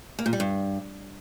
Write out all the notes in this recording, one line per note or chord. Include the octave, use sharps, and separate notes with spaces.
A#3
A#2
G3
G2